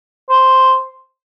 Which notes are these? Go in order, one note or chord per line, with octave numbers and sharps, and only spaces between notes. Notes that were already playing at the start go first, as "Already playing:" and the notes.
C5